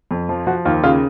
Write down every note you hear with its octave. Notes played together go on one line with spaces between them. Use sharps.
F2
F3
F3 F#4
D#2 F4
C#3 F4